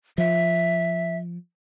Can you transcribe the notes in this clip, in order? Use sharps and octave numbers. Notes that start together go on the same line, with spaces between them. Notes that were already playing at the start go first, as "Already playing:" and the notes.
F3 E5